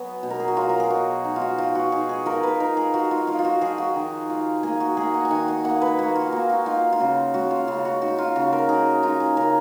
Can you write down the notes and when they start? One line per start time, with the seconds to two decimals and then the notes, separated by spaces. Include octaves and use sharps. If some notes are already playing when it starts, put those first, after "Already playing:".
Already playing: F#3 B3 F#4 G#4
0.23 B2
0.30 A#4
0.40 G#4
0.48 F#4
0.57 F#3 F4
0.69 A#4
0.80 G#4
0.90 B2 F#4
1.25 D#4
1.36 F4
1.41 F#4
1.58 F3 F4
1.75 F#4
1.92 D#4 G#4
2.09 G#4
2.26 F3 A#4
2.43 B4
2.60 D#4 A#4
2.77 G#4
2.94 F3 F#4
3.11 F4
3.27 F3 F4
3.39 F4
3.44 F#4
3.61 F3 G#4
3.78 F#4
3.96 D#3
4.30 F4
4.63 A#3 G#4
4.80 F#4
4.97 A#3 G#4
5.14 F#5
5.25 G#5
5.31 D#3 F#5
5.48 F#5
5.65 A#3 F#5
5.82 B4
5.99 A#3 F#4
6.16 F4
6.32 A#3 F#4
6.49 F#4
6.66 D#4 F4
6.92 F4
7.00 C#3 F#4
7.34 G#3 F#4
7.51 F4
7.67 C#3 F#4
7.85 F#4
8.02 D#4 F#4
8.18 F4
8.36 C#3 F#4
8.53 A#4
8.69 D#4 G#4
9.03 D#4 F4
9.20 G#4
9.37 C#3 A#4